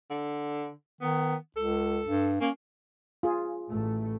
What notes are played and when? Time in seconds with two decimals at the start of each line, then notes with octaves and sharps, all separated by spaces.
0.10 D3
1.01 D#3 B3
1.56 C#2 A4
2.07 G2
2.41 A#3 C#4
3.23 F4 G#4
3.70 A1 A3